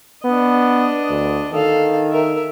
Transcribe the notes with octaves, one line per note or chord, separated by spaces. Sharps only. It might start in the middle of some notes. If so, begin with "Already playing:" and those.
B3 D4 D#5
D2
D#3 A4 F5
A#4 E5